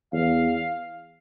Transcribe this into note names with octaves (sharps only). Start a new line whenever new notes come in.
E2 F5